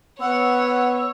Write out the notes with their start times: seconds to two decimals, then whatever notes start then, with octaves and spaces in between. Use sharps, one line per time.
0.21 B3 C#5 F#5 E6